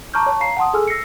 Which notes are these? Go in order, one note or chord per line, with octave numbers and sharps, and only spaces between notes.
A5 A#5 C#6 D6 F6 G6
C#5 A5 C#6
F5 A#5 C7
F#5 A5 C6 D#6
G#4 A4 G#5 E6 F6
E6 A#6 C7 C#7